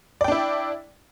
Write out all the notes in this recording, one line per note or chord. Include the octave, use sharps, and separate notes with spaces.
D4 E4 D5 G5